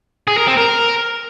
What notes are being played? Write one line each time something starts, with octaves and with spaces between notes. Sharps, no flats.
G#4
A#4
C4
A#4